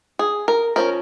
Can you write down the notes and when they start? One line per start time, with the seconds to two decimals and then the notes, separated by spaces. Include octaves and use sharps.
0.19 G#4
0.48 A#4
0.76 F3 C#4 A#4